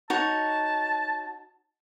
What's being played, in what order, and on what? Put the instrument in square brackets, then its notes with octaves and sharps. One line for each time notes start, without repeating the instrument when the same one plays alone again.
[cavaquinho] D#4 F#4 C#5 [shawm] A5